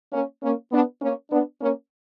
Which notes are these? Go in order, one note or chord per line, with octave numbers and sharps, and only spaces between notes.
A#3 C#4
A#3 C#4
B3 D4
A#3 C#4
B3 D4
A#3 C#4